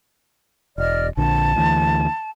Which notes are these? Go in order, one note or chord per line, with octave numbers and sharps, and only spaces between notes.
E1 D5 D#5 F6
A#1 D3 A5
D2 E3